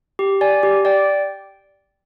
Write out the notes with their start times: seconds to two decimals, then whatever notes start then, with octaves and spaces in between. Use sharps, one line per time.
0.19 G4
0.41 D5 G#5
0.63 G4
0.85 D5 G5